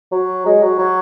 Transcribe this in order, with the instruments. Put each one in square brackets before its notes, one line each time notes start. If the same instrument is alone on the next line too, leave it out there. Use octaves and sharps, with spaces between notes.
[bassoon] F#3
G#3
F#3
F#3